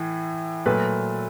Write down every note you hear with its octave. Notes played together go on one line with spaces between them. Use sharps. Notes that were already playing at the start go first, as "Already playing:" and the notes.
Already playing: A2 E3
A#2 F#3 A3 B4